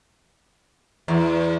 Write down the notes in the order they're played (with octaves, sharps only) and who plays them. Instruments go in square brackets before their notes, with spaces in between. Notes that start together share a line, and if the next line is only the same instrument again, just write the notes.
[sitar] E2